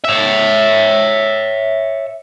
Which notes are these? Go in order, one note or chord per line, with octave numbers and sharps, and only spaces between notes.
C#5 E5